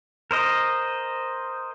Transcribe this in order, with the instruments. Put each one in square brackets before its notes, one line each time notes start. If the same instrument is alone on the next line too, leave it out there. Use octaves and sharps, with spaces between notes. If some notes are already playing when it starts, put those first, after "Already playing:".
[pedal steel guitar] A#4 C5 D#5